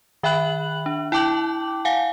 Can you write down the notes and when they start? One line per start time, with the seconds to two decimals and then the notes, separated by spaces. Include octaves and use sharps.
0.23 D#3 E5 G5 B5 F#6 F#7
0.86 D4
1.12 E4 G5 A5 D6 G6 F#7
1.85 F5 F#5 G#5